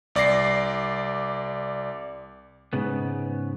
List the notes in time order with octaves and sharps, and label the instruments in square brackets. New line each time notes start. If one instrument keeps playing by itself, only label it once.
[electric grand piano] C2 D5 D6 A#6 C7
[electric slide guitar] G#2 C#3 B3